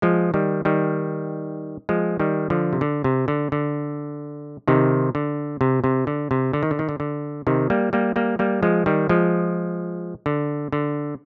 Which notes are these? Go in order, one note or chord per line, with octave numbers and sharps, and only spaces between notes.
F3 G#3
D#3 G3
D#3 G3
F3 G#3
D#3 G3
D3 F3
C3
D3
C3
D3
D3
C3 D#3
D3
C3
C3
D3
C3
D3
D#3
D3
D#3
D3
D3
C3 D#3
G3 A#3
G3 A#3
G3 A#3
G3 A#3
F3 G#3
D#3 G3
F3 G#3
D3
D3